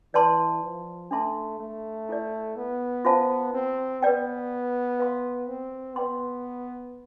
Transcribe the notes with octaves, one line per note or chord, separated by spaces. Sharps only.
E3 B4 D5 A5 C6
F3
A3 D4 A4 E5 A5 C6
A3
E4 A4 D5
B3
F4 C5 F5 A5
C4
B3 B4 D5 G5
B4 F5 C6
C4
B3 B4 D5 G5 C6